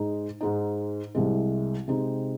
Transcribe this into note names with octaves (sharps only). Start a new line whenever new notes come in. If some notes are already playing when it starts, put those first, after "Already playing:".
Already playing: G#2 G#3 D#4
G#2 G#3 D#4
C2 C3 G#3
C3 G#3 C4 D#4